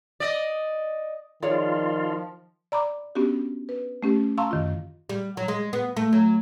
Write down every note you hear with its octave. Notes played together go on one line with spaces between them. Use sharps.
D5 D#5
D#3 F3 F4 G#4 C#5 D5
D5 A#5 B5 D6
B3 C#4 D4 F#4 G4
B4
A3 C#4 G4
F5 A5 A#5 C6 C#6 E6
F#2 D#3 F4
G3
F#3
G#3
B3
A3
F#3